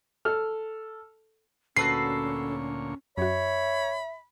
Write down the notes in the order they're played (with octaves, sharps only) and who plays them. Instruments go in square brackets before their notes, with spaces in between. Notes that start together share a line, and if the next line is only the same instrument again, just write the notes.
[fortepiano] A4 F6
[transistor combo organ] D2 A#2 C#5 [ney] C#4 [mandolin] F#4 A4 B4 [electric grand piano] C7
[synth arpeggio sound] F#2 F#4 [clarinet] C#5 [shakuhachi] E5 [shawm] B5